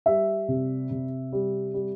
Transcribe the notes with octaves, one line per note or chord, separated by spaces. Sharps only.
G3 E5
C3
C3
G3
G3